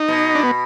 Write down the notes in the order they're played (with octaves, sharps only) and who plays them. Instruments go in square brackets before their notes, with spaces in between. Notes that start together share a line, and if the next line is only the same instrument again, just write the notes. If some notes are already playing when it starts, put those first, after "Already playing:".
Already playing: [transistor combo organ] D#4
[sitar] B2
[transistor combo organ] D4
B3